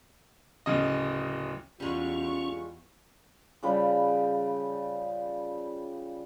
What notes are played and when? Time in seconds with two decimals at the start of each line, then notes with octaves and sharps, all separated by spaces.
0.66 D1 C#3 D#5
1.80 E2 G3 G#3 C#4 F4 C#6
3.63 C#3 F3 G3 B5